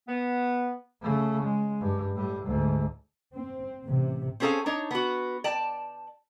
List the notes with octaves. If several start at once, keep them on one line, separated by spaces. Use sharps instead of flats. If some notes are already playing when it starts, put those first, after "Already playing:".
B3
C#3 A3
G#3
G2
A2 G3
D2 G#2
C4
A1 C3
C4 C#4 G#4 A4 C#5 F5
D4 D#4 C#5
B3 F#4
D5 G5 A5